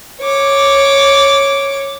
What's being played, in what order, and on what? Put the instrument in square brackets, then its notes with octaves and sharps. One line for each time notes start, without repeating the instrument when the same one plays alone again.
[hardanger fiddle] C#5 D6